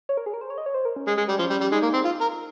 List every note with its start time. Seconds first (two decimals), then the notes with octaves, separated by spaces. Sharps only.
0.09 C#5
0.17 A#4
0.26 G#4
0.34 A#4
0.41 C5
0.50 C#5
0.58 D#5
0.66 C#5
0.74 C5
0.85 A#4
0.96 C#4
1.07 G#3
1.17 G#3
1.29 G3
1.39 F3 C#4
1.50 G3
1.61 G3
1.72 G#3 D#4
1.83 A#3
1.94 C4
2.05 F4
2.21 A#4